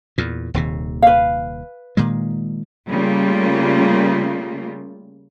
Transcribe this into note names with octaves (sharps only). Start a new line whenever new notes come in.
E2 A#2
D#1 D#2 C3
B4 F5
A#2 D#3 G#3
C#3 G3 A3 A#3 F4